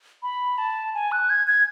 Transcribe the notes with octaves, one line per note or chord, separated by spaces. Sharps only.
B5
A5
G#5
F#6
G#6
G#6